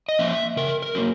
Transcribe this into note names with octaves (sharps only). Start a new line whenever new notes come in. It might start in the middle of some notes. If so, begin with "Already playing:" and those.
D#5
F3 A#3 C#4 E5
C#3 A#4
A#4
F#3 A#3